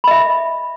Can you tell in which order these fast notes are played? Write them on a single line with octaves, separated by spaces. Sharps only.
B5 D#5 E5